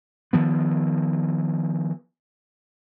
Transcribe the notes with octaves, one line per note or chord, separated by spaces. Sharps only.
D#3 F3 B3